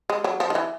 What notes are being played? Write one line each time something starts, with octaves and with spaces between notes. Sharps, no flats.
G#3
F#3
F3
D#3
E3